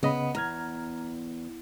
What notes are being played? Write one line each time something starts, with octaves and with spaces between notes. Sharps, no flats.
C#3 B3 D#5 B5
E2 A#5 F6 G#6